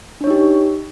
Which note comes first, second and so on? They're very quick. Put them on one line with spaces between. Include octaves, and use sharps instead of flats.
D4 C#5 D#4 G4